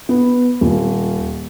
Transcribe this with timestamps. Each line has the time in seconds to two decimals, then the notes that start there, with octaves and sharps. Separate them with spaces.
0.09 B3
0.61 D#1